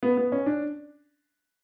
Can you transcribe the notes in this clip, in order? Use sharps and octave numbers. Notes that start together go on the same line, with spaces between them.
B3
B3
C#4
D4